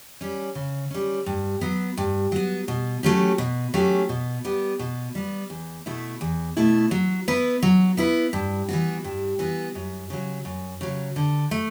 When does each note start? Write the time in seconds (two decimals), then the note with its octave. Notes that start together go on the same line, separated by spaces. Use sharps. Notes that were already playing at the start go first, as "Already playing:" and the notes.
0.21 G3 C#4
0.55 C#3
0.91 G3 C#4
1.26 G2
1.61 F#3 B3
1.97 G2
2.32 F#3 B3
2.68 B2
3.03 F#3 A3 C#4 G4
3.38 B2
3.74 F#3 A3 C#4 G4
4.09 B2
4.45 G3 B3
4.79 B2
5.15 G3 B3
5.50 E2
5.86 B2 A3 E4
6.21 E2
6.57 B2 A3 E4
6.91 F#3
7.28 B3 E4 B4
7.62 F#3
7.97 B3 E4 B4
8.33 G2
8.69 E3 B3 F#4
9.04 G2
9.39 E3 B3 F#4
9.75 F#2
10.10 C#3 F#3
10.45 F#2
10.81 C#3 F#3
11.16 D3
11.51 A3